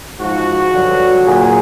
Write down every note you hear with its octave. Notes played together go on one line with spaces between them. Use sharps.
G#2 F3 F#4
G2 D3 F#3
A#2 F#3 G#4